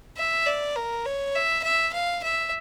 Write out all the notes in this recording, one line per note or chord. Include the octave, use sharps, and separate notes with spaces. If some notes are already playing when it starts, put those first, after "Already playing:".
E5
D5
A#4
C#5
E5
E5
F5
E5